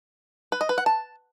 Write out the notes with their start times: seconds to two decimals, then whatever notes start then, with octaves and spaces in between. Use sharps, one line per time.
0.52 B4
0.61 D#5
0.69 B4
0.78 F#5
0.86 A5